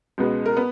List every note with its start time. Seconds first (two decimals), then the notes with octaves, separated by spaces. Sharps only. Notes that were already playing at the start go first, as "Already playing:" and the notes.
0.18 C#2 B2 G#3 B3
0.46 A#4
0.57 B3